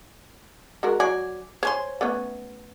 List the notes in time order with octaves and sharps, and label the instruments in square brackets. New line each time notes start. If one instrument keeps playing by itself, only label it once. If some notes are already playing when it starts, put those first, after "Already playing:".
[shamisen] G#3 F#4 A#4
[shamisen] F#3 [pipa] D5 G#5
[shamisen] C5 [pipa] C#5 G#5 C6
[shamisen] A3 B3 C#4